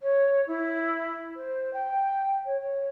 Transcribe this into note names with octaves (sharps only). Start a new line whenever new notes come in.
C#5
E4
C5
G5
C#5
C#5